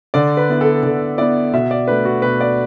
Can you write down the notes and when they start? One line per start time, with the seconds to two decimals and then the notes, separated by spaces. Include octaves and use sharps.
0.14 D3 D5
0.37 B4
0.49 B3 E4
0.61 A4
0.83 D3 A4
1.18 B3 E4 D5
1.53 B2 E5
1.71 D5
1.87 A3 D4 B4
2.05 F#4
2.22 B2 B4
2.41 D5